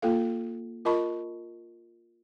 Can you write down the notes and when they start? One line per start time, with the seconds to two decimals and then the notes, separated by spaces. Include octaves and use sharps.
0.02 A#3 F4 A4 F5
0.85 F4 A#4 D#5 A5 B5 C#6